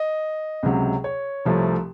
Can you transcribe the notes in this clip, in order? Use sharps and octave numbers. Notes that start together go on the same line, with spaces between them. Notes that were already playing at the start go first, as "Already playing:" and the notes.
Already playing: D#5
C#2 C3 F#3
C#5
C2 C3 F3 A3